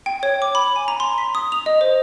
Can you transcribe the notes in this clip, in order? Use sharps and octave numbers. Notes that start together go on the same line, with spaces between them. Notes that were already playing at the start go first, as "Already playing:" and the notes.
G5
C#5
D6
B5
G#5
A#5
C6
B6
D#6
F7
D#5
C5